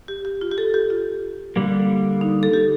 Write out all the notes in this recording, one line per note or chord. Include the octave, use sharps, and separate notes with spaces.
G4
G4
F4
G4
A4
G4
F4
D3 G3 A#3
D#4
A4
G4